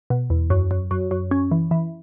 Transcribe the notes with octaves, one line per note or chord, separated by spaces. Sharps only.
B2
E2
F#2
F#2
F#2
F#2
C#4
E3
E3